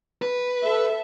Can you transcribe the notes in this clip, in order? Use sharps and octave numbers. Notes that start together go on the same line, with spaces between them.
B4
A4 E5